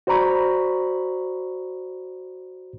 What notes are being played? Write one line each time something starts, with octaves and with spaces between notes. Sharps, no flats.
F#4 C5 D5 A#5 B5 C#6